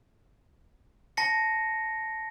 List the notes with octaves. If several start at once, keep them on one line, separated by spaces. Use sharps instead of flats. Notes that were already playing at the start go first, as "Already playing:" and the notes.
A5 A#6 C#7